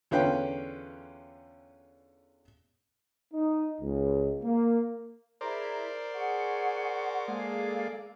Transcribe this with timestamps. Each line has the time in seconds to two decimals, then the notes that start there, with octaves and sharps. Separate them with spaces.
0.11 E2 D3 C#4 F4 B4 G5
3.33 D#4
3.81 C#2
4.43 A#3
5.41 E4 G#4 A#4 C5 D5 A#5
6.13 G#4 F#5 C#6
7.28 G#3 A#3 G#4 A4 D5 F5